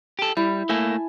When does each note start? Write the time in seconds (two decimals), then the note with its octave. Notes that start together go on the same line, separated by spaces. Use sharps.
0.19 G4 A4
0.37 G3 E4
0.69 A3 A#3 E4 G#5 A5